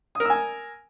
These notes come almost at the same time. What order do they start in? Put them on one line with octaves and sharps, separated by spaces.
D#6 A#4 E6 G#5